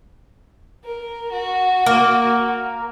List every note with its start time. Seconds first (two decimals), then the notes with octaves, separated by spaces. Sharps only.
0.84 A#4
1.32 F#4
1.86 A#3